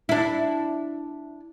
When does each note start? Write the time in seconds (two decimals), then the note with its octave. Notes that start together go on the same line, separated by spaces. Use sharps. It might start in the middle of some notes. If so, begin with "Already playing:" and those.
0.09 D4 E4